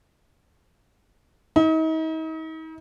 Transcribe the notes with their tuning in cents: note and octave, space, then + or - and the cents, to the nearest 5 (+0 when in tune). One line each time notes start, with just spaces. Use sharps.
D#4 +40